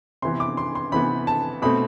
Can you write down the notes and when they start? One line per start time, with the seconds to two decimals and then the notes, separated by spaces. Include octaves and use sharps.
0.22 C3 E3 B3 C6
0.40 D6
0.57 C6
0.75 C6
0.92 C3 E3 B3 B5
1.27 A5
1.62 B2 A3 C4 B5